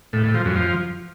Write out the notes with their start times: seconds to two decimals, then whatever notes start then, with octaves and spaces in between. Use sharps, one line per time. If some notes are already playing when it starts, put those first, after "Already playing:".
0.13 A2
0.24 A2
0.34 F3
0.45 F#2
0.56 F3